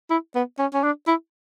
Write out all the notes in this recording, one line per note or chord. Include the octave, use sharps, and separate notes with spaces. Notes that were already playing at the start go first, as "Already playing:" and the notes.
E4
B3
C#4
C#4
D4
E4